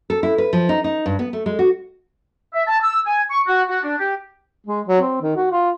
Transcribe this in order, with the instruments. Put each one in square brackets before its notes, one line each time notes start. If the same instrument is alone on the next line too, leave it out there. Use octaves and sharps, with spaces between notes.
[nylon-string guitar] A4
E4
B4
F3
D#4
D#4
G2
B3
A3
G#3
F#4
[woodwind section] E5
A5
E6
G#5
C#6
F#4
F#4
D4
G4
[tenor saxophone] G#3
F#3
C4
D#3
F#4
F4